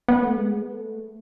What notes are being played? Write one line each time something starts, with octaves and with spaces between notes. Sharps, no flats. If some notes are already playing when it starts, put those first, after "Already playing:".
B3
A3
G#3
B3
A3